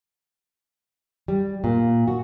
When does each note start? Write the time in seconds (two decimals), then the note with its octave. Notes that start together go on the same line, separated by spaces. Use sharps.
1.28 G3
1.64 A#2
2.08 F#4